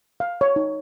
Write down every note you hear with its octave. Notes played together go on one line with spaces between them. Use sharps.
F5
C#5
D#4